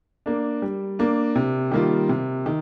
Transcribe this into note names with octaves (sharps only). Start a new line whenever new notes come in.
A#3 D4
G3
A#3 D4
C3
D#3 G3 A#3 F4
C3
D#3